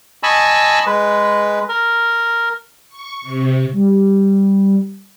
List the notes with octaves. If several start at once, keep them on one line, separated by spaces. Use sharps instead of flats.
D#5 G#5 A5 B5 C#6 E6
G#3 B4
A#4
C#6
C3
G3